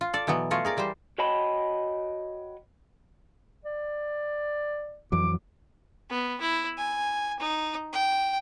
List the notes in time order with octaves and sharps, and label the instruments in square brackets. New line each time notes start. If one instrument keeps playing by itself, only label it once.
[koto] F4
A4 D5
B2 E3 F#3 B3
A3 F4 C#5 D#5
G#4 A#4 D5
E3 G3 G4 C5
[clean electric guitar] F#4 C#5 D#5 G5 A5 B5
[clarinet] D5
[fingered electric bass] F2 E3 F#3 [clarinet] D6
[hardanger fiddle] B3
E4
G#5
D#4
G5